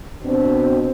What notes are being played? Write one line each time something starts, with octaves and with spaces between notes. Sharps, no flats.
B2 C4 D4